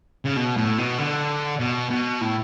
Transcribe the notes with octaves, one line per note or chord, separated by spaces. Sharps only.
C#3
B2
A2
B2
D3
B2
B2
A2